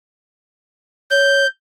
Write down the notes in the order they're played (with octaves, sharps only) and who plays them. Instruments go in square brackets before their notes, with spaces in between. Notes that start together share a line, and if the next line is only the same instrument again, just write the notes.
[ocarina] C#5 [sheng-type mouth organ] G6